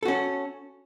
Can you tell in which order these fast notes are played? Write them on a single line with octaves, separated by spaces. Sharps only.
A4 F#4 C#4